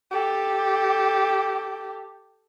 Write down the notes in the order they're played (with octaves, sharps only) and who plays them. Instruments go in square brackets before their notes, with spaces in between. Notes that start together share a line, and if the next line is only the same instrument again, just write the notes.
[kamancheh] G4 A4